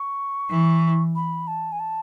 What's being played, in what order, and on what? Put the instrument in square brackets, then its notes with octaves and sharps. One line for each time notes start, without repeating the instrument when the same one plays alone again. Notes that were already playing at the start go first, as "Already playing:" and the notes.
Already playing: [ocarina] C#6
[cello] E3
[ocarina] B5
A5
G#5
A5